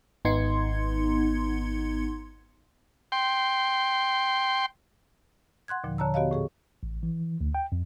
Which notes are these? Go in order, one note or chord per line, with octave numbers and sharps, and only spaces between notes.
G#1 B3 D#4 C6 G#6 C#7
G5 C6
F#5 C6 F#6 G#6
D#2 A#2 D3 F3
D3 C#5 A5 A#5 E6
B3 F#4 G4 C#5 D#5 F5
A2 G#4 C#6
A1
E3
D2
G5
F2